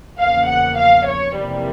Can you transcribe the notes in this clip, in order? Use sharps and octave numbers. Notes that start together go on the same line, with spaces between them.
E2 C#3 F3 A#3 F5
F#5
F5
C#5
F2 C3 E3 G3 A#3